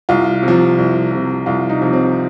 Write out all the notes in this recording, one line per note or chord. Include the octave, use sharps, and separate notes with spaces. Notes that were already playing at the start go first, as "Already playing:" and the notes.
C2 F4
C3
F3
C2
C3 F3
C2 F4
D#4
C3 F3
C4